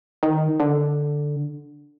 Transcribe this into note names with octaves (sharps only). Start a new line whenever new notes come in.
D#3
D3